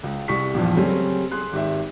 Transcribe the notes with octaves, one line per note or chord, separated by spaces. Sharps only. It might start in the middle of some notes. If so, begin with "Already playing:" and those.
C#2
C2 G3 C#6 B6
A#1 E2 G2 F3
C#3 F#3 G3 A3 C4 C#4
G#4 C6 F#6
G#1 G4 E5